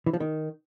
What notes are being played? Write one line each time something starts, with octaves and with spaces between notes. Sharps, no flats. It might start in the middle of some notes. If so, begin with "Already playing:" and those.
E3
F3
D#3